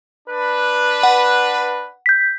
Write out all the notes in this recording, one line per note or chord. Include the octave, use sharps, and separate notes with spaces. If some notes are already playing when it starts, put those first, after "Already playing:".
D4 B4
F#5
G6 B6